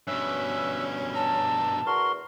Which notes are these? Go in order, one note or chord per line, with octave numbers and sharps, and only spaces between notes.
G2 B2 C#4 E5 E6 F#6
A5 A#5 E6
E2 F#4 A#4 C6